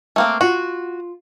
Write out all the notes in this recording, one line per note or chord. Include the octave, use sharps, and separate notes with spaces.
A3 A#3 C4
F4 F#4